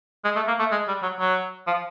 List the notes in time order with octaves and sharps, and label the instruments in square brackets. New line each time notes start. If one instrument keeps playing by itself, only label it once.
[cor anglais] G#3
A3
A#3
A3
G#3
G3
F#3
F#3
F3